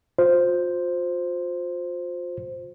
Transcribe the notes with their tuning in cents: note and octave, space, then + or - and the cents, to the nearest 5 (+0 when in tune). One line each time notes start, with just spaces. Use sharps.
F4 +35 C5 +0